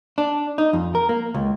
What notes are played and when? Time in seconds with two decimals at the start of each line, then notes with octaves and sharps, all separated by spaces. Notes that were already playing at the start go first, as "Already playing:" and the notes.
0.18 D4
0.58 D#4
0.73 F2
0.95 A#4
1.09 A#3
1.34 C#2